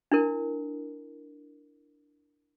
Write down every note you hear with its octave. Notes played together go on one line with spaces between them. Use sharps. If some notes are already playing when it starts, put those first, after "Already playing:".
D4 E4 A#4